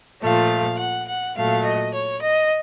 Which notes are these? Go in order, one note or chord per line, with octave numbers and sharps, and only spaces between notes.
A#2 F3 A3 F5
F#5
F#5
A#2 F#3 A3 F5
D#5
C#5
D#5